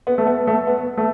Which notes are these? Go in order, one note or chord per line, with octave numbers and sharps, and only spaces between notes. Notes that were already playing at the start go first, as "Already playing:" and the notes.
B3
A3
B3
A3
B3
A3